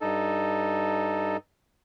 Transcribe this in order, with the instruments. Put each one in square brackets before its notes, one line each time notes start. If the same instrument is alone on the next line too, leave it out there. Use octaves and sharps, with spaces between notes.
[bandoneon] G2 D#4 A4